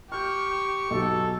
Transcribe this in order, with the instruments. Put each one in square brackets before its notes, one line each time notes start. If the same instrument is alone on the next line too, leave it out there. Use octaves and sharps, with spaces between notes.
[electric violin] G4 [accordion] C#6 [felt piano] F6 G6
[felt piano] B1 F#3 [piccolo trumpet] A4